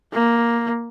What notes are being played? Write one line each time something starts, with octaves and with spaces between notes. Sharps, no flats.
A#3